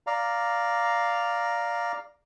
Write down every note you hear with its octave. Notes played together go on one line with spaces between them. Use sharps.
D5 F5 A#5